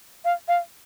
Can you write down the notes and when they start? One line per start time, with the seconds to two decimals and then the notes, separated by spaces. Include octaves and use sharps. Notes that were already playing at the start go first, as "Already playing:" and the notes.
0.25 F5
0.48 F5